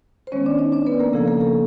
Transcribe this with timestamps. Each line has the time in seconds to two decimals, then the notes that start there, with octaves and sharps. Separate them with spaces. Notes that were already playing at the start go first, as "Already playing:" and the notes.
0.27 C5
0.32 D#3 G#3 B3 C#4 C#5
0.46 D4 D5
0.59 D#4 D#5
0.72 D4 D5
0.86 B3 B4
1.00 A#3 A#4
1.13 C#3 F3 A#3 A4
1.28 A#3 A#4
1.41 A4